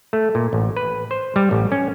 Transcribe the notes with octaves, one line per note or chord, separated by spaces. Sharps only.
A3
A#2
A1
B4
C5
G3
A1
C#4